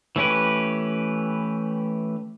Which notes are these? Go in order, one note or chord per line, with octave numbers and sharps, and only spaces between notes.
E3 A3 C#4 G4 B4